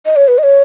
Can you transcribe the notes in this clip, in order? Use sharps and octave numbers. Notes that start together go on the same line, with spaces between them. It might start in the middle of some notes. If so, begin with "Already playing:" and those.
D#5
C#5
B4
D#5
C#5